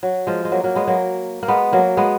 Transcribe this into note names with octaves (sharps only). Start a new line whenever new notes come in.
F#3
F3 G#3
G#3
F#3 A#3
F#3 A#3
G#3 B3
F#3 A#3
A#3
G#3 B3
F#3 A#3
G#3 B3